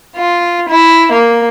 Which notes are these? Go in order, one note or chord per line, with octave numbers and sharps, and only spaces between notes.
F4
E4
A#3